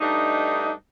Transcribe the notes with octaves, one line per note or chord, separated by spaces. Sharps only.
G2 A3 D4 D#4